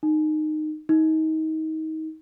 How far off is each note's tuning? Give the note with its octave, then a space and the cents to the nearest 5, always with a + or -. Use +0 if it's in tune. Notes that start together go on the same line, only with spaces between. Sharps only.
D#4 -15
D#4 +25